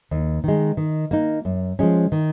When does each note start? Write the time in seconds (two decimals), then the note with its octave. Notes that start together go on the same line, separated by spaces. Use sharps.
0.11 D#2
0.44 D#3 G#3
0.77 D#3
1.11 A#3 D#4
1.45 F#2
1.79 F3 G#3 C#4
2.12 D#3